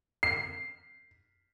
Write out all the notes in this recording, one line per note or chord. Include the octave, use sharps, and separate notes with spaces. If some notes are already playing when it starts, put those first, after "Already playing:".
C7